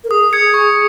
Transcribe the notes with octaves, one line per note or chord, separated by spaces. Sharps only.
A#4
G#4 D#6
G#6 C#7
C#6